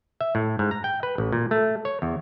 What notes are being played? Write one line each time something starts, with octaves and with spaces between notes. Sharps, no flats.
E5
A2
G#2
A#5
G5
B4
A1
A#2
A3
C#5
E2